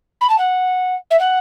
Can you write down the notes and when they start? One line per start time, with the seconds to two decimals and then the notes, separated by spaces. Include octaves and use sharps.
0.20 B5
0.29 A5
0.38 F#5
1.10 E5
1.19 F#5